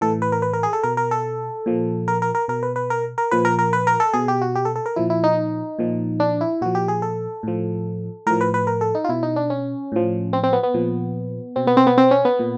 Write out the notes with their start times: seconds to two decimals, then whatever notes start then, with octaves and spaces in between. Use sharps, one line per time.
0.01 A2 E3 A4
0.22 B4
0.32 A#4
0.42 B4
0.53 A#4
0.63 G#4
0.73 A4
0.83 B2 A#4
0.97 A#4
1.11 A4
1.66 A#2 F3
2.08 A#4
2.22 A#4
2.35 A#4
2.48 B2 A#4
2.63 B4
2.76 B4
2.90 A#4
3.18 A#4
3.31 A#2 F3 B4
3.45 A#4
3.59 A#4
3.73 B4
3.87 A#4
4.00 A4
4.13 B2 G#4
4.28 G4
4.41 F#4
4.55 G4
4.65 A4
4.76 A4
4.86 A#4
4.96 A#2 F3 E4
5.10 E4
5.24 D#4
5.79 A#2 F3
6.20 D4
6.41 E4
6.61 A#2 F3 F#4
6.75 G4
6.88 G#4
7.02 A4
7.43 A2 F3
8.27 A2 F3 A#4
8.41 B4
8.54 B4
8.67 A#4
8.81 A4
8.95 D#4
9.04 F4
9.09 B2 E4
9.23 D#4
9.36 D4
9.50 C#4
9.92 A2 F3
10.33 C4
10.43 C4
10.53 B3
10.63 B3
10.74 A#2 F3
11.56 B2 C4
11.67 B3
11.77 C4
11.87 B3
11.98 C4
12.11 C#4
12.25 B3
12.39 A#2